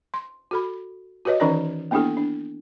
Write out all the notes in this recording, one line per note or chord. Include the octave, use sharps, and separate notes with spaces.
C6
F#4 A4 B5
F#4 G4 B4 C#5 D#5
D#3 E3 C#4 D#4 A#4 D5
A#3 B3 D4 E4 G4 A4
D4